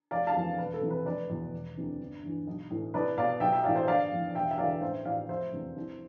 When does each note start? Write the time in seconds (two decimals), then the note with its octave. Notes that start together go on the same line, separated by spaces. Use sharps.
0.11 F1 D5 F5
0.27 F5 A5
0.36 F2 C3 E3
0.58 E1 B4
0.74 A4
0.82 E2 C3 E3
0.91 B4
1.06 F1 B4 D5
1.30 E2 B2
1.53 E1
1.77 D2 C3 E3
2.00 G1
2.23 G2 E3
2.47 B1
2.70 A2 E3
2.94 C2 B4 D5
3.17 B2 D5 F5
3.40 B1 E5 G5
3.52 E5 G5
3.64 A2 E3 D5 F5
3.76 C5 E5
3.88 G1 D5 F5
4.12 F2 E3
4.35 E1 E5 G5
4.51 E5
4.58 E2 D3 D5 F5
4.81 A1 C5 E5
5.05 A2 E3 D5 F5
5.29 F1 C5 E5
5.53 E2 C3
5.76 C2